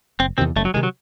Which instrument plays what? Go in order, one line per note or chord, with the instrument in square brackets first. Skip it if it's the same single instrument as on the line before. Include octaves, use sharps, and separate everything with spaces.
[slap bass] F#1 [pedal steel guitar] C4
[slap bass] E2 C3 D#3 [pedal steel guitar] C4
[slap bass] F#1 [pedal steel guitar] A3
[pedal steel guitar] F#3
[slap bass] C3 D#3 [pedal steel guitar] G#3
[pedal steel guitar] F#3